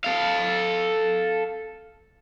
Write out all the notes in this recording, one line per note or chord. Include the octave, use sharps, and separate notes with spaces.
A4 F5